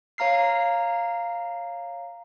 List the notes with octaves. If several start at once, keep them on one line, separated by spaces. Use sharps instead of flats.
C#5 F5 A#5 F6 C7